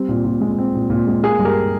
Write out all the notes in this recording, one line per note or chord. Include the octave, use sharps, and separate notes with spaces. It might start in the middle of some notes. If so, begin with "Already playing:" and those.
Already playing: G3 C4
A#2
A#2
G#3
C4
A#2
A#2
G#3
A#3 G#4
G2
G4 A#4